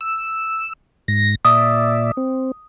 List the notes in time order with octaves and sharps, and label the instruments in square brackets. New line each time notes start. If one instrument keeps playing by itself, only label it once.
[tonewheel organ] E6
G#2 A#6
[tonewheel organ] A#2 D5 E5 [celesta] D#6
[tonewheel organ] C4